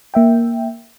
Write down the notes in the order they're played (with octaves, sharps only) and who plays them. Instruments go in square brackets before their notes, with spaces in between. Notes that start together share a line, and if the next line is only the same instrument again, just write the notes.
[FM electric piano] A#3 E5 G5